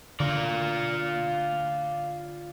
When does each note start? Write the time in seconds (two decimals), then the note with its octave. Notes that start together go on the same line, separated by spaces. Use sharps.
0.20 D3 F4 D5